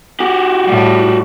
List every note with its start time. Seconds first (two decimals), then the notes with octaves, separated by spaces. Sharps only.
0.20 F#4 G4
0.67 A2 G3